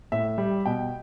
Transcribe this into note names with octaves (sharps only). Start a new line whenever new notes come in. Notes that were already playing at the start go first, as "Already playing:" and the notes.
A2 E5
G3
B2 G5